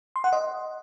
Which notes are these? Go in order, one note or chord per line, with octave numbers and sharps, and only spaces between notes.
C6
F#5
D#5